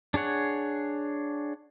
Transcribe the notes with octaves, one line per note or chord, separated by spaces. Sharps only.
D4 G#4 C#5 F#5